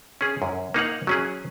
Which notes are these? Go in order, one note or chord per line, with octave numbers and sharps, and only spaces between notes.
C#4 G#4
F#2
A#3 D#4 F5 F#5
F#3 C#4 G#4